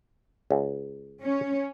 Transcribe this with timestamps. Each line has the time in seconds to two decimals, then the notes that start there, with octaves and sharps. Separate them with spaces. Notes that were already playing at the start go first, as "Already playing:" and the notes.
0.51 C#2
1.21 C#4